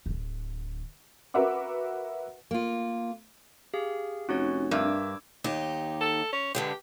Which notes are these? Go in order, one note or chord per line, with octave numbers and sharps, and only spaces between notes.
D1 D3
F#4 A#4 B4 E5 F#5 D6
A#3 F4
G4 G#4 F5
F1 C#4 D#4 F#4 C#5
G2 A#4 E5 D6 E6 G#6
D#2 D#4 G4
A4
C#4
G2 D3 G#3 G4